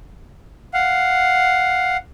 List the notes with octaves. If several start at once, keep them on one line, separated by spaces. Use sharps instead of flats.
F5 F#5